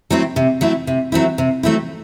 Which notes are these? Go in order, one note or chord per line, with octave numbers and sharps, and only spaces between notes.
F#3 A3 C4 E4
C3
F#3 A3 C4 E4
C3
F#3 A3 C4 E4
C3
F#3 A3 C4 E4